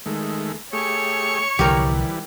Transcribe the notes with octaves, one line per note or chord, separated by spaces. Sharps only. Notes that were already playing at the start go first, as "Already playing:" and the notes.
D#3 G#3 A3
A3 G4 G#4 C#5
C2 D3 E3 F3 G3 G4 A#4